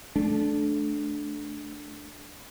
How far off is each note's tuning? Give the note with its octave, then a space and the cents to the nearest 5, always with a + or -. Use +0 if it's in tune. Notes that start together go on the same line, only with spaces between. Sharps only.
A3 -20 D4 +0